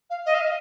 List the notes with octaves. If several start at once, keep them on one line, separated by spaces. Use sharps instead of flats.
F5
D#5
F5
D#5